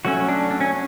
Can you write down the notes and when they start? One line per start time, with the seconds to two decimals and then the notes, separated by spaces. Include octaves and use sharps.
0.05 F#3 A3 C#4 F#4
0.28 D4
0.51 D4
0.61 C#4